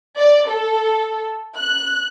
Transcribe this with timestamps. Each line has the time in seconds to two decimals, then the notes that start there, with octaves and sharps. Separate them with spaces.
0.18 D5
0.48 A4
1.57 F#6